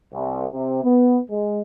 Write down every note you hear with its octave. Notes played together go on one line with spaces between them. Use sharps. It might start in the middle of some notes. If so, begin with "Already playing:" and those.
C2
C3
B3
G#3